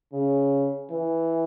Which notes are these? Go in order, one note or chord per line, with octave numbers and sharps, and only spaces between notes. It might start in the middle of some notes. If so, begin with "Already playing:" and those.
C#3
E3